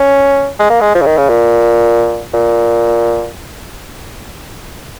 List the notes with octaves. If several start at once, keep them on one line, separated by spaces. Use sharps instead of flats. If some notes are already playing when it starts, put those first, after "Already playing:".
Already playing: C#4
G#3
A#3
G#3
F3
C#3
D#3
C#3
A#2
A#2